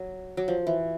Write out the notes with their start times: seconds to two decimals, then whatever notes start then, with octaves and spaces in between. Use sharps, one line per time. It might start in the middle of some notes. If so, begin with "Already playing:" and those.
Already playing: F#3
0.37 F#3
0.48 F3
0.67 E3